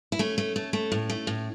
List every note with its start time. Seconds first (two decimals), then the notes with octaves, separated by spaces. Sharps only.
0.12 E4
0.19 A3 C#4
0.38 A3
0.56 A3
0.73 A3
0.92 A2
1.10 A3
1.27 A2